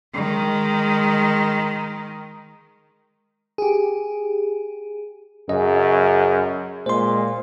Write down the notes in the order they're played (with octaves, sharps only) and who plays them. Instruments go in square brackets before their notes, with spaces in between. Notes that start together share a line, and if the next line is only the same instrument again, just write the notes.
[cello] D#3 G#3
[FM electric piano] G4 G#4
[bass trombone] F#2 [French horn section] C#3 G#4 [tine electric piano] D#5
[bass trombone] A#2 [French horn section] G#3 [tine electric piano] C5 C6